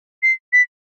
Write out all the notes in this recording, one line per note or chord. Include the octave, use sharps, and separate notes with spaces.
C7
B6